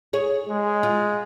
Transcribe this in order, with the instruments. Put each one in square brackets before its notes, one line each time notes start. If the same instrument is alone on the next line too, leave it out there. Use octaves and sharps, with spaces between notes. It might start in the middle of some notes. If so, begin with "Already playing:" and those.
[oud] G#4 C#5
[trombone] G#3
[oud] F4